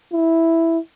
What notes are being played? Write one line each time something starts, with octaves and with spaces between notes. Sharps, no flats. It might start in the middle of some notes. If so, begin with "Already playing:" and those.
E4